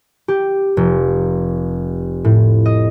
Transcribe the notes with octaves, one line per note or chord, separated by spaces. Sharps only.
G4
F1
A2
D#5